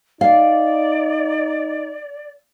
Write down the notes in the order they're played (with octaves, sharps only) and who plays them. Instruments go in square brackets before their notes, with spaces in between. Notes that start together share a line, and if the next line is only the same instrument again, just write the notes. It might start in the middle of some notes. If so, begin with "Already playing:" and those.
[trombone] D#4 [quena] D5 [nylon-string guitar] F5